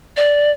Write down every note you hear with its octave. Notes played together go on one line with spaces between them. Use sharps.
D5